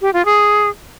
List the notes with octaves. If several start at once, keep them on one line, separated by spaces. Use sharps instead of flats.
G4
F4
G#4